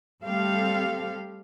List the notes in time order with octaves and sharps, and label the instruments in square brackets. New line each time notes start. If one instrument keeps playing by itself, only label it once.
[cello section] G3 A3 C4 G4 A4 F5